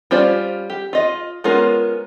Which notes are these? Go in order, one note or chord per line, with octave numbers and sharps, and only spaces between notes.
G3 C#4 F4 C5 D5
G4
F4 D#5
G#3 B3 C#4 F4 A#4